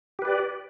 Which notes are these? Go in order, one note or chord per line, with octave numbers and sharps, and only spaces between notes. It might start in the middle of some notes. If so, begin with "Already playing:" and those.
G4 B4 D5